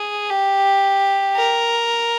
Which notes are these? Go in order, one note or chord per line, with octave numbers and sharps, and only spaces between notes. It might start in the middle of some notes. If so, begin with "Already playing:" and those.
Already playing: G#4
G4
A#4